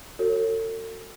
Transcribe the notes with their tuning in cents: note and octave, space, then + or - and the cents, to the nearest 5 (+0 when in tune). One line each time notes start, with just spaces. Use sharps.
F#4 +0 A4 +40 C#5 -15